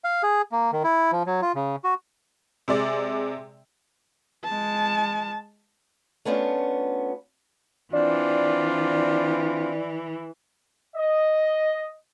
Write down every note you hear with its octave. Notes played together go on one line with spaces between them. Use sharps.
F5
G#4
A#3
D#3
E4
F3
F#3
F4
C#3
F#4
C3 G#3 D5
G#3 A5
A3 B3 C#4 D4 F4
E3 C4 D4 F4 D5
D#5